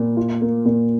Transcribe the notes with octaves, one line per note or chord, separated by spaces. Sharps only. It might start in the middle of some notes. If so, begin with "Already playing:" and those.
Already playing: A#2
F4
A#3
A#2